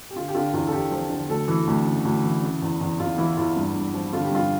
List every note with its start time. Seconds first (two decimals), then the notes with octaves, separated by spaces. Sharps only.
0.11 G4
0.16 D3 F4
0.28 G4
0.34 D3 F4
0.53 E2 F4
0.67 A4
0.72 E2 G4
0.92 F3
1.10 D3
1.29 D2 A4
1.48 E3
1.67 D2
1.86 C#3
2.05 D2
2.24 E3
2.43 C#3
2.62 E2
2.81 E2
2.99 E2 F4
3.18 E3 E4
3.37 E2 F4
3.56 G2
3.74 G2
3.94 F3
4.13 D3 F4
4.24 G4
4.31 G2 F4